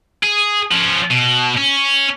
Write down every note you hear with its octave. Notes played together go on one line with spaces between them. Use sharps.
G#4
F3 C#4
B2
C#4